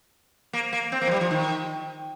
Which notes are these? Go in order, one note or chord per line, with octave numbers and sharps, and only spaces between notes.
A#3
A#3
C4
A#3
F3
G3
F3
D#3